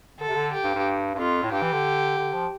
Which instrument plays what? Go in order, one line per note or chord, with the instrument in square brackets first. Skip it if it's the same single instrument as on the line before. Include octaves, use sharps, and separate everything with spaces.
[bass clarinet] D3 [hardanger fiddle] A4
[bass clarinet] C3
D3
[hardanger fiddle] G4
[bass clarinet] G2
G2
G2
[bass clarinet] F2 [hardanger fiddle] F4
[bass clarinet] A2
[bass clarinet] G2 [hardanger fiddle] G4
[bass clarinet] E3
D3
D3
F3